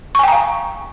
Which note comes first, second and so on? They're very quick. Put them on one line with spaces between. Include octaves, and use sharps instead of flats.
C#6 G#5 G5 A#5 F5